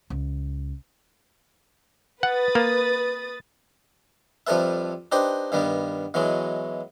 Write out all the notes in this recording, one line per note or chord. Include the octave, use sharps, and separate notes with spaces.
C#2
B4 F#5 D#6 A6
A#3
F2 F3 G3 A4 B4 E5
D4 D#4 G4 B4 C5
G2 D#3 G3 B3
B2 E3 F#3 G#3